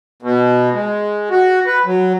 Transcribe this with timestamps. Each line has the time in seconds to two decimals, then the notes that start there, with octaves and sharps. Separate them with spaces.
0.22 B2
0.73 G#3
1.30 F#4
1.66 B4
1.85 F#3